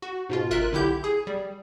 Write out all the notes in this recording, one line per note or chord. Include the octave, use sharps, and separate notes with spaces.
F#4
G#2 B2 F4
G1 F4 A#4 E5 F#6
B1 D3 E4 G4 G6
G#4
G3